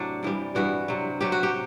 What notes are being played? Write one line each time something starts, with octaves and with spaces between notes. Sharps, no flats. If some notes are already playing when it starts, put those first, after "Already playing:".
Already playing: A2 C3 F#3 D4
G2 E3 G3
G2 E3 G3 F#4
C3 F#3
C3 F#3 G4
F#4
G4